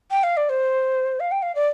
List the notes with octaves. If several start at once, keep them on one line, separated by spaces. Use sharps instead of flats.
G5
F5
D5
C5
F5
G5
F5
D5